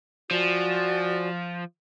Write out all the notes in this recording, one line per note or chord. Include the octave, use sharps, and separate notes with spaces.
F3 F#4 D5 G#5